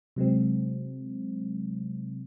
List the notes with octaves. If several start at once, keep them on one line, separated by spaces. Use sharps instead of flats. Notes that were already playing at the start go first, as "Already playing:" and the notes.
C3 F#3 G#3 C4